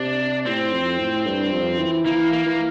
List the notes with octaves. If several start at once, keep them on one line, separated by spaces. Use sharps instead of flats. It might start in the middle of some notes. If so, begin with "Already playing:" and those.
Already playing: C3 D4
A2 C4
F2
A2
G2
F2
E3
E3 A#3
A#3
E3